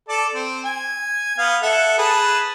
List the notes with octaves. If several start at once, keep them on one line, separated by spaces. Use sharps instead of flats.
A4 D5 A5
C4
G#5
B3 F5
A4 E5 F#5
G#4 B4 A5